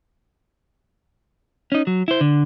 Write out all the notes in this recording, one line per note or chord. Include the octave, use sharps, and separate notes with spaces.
C#4 D#4
F#3
E4 C5
D3